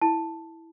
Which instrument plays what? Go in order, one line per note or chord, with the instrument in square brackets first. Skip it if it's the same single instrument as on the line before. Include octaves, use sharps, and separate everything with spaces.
[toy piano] E4 A5